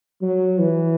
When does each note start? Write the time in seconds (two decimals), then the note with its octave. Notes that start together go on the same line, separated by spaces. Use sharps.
0.22 F#3
0.59 E3